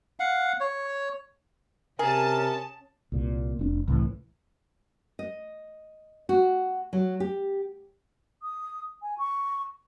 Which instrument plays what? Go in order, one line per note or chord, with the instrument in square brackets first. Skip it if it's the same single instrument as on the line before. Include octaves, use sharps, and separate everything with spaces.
[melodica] F5 F#5
C#5
[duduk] C3 [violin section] C#4 A5 [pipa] G#4 [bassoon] A#4
[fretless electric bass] C2 A#2
F1 C#4 D4
C2 A2 E3
[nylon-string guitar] D#5
F#4
F#3
G4
[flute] D#6
G#5
C#6